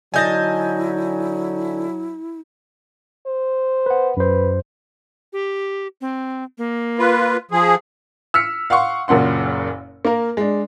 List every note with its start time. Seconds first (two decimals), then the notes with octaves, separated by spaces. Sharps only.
0.14 D3 F#3 D#4 E4 G#5 A5 G6 A#6
3.26 C5
3.86 B4 F#5
4.17 F#2 B4 C5
5.33 G4
6.01 C4
6.58 A#3
6.98 F4 B4
7.51 F3 G#4
8.34 E6 F6 B6 C#7
8.70 F5 F#5 C6 C#6
9.08 F#1 F#2 A#2 F#5 C6
10.05 A#3 A#4
10.37 G#3 D4